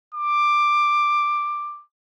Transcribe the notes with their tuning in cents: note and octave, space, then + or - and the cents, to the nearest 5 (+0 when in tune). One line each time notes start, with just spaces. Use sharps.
D6 +10